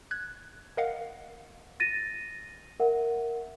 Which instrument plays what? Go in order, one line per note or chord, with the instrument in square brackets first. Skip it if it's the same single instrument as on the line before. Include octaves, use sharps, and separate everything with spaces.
[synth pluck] F#6 G#6
A#4 D#5 F5 F#5
[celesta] A6 A#6 D#7
A#4 E5 F#5